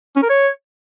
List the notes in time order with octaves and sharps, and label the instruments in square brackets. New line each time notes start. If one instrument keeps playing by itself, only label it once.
[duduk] C#4
A#4
C#5